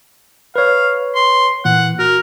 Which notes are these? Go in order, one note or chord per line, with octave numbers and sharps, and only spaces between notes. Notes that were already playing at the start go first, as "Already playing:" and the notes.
B4 C#5 F5
C6
A#2 E3 F#5
F#4 A#4